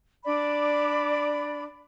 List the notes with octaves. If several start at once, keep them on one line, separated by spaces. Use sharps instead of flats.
D4 D5 B5